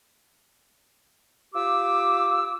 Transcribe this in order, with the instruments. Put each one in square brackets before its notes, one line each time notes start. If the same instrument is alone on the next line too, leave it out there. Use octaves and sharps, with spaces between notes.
[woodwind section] F4 G4 D6 E6